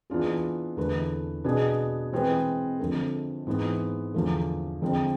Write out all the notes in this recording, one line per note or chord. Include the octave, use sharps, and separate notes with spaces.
E3 B3 D4 F4 G#4
E2 D3 A3 E4 B4
B2 B3 D4 G#4
E3 G#3 C4 G#4 B4
F2 D3 A3
G#2 E3 B3
E2 D3 F3 A3
F2 D3 G#3 C4